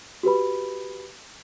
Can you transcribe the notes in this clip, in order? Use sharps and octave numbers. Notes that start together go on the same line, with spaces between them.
F#4 G4 B4 B5